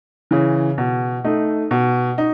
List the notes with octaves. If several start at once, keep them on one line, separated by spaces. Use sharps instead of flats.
C#3 E3
B2
A3 D#4
B2
D#4